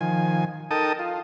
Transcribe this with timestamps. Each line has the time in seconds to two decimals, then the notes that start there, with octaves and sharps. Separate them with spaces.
0.01 D#3 F3 G#5
0.71 D#4 A4 A#4 G5 A5 D#6
0.99 F4